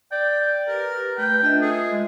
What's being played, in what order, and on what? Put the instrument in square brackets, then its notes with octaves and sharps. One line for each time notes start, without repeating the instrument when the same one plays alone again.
[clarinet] D5 [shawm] G5
[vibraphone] G4 B4 [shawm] A#4
[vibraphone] A3 [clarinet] B4 [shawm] G5
[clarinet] D4 [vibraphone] F4 D#5 E5
[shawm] G#4 [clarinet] A4
[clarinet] G#3